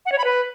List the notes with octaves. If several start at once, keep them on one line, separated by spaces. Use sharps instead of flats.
F#5
C#5
B5
B4